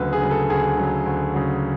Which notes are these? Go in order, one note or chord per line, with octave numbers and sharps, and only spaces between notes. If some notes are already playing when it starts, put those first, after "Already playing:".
Already playing: D2 C#3 F#3 B4
G#4
C#3 F#3
A4
D2 G#4
C#3 F#3
D2
C#3 F#3